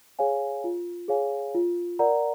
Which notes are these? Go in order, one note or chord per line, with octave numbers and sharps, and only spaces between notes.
G#4 C#5 F5 G#5
F4
G#4 C#5 F5 G#5
F4
A#4 D5 F#5 A#5